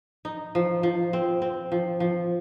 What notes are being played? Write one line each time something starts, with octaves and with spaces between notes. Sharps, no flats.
D#4
F3
F3
C4
C4
F3
F3